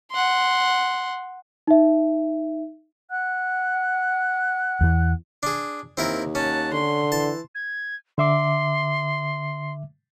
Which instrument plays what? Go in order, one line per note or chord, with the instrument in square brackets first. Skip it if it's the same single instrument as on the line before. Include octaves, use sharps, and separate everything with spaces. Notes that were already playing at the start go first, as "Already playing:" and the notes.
[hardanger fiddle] F#5 C6
[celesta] D#4 E5
[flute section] F#5 F#6
[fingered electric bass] E2 E3
[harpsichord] D4 G#4
[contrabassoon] D#2 [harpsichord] C4 E4 A#4
[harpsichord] C#4 [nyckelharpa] F#5 A5
[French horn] D3 [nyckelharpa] C6
[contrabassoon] E3 [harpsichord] A5
[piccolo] G#6
[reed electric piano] D3 E5 D6 [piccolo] C6